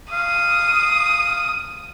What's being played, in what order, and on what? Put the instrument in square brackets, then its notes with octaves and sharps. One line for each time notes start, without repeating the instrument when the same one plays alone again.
[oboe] F5 [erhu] D#6